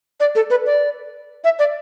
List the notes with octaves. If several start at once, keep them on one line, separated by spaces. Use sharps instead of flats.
D5
A4
B4
D5
E5
D5